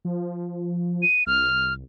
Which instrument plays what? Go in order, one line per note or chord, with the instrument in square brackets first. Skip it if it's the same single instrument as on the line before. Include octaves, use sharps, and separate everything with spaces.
[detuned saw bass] F3
[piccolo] D#7
[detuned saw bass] C2 [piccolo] F6